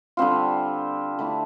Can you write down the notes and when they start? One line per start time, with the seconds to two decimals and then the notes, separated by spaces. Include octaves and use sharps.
0.17 D3 G3 C4 F4
1.19 D3 A3 E4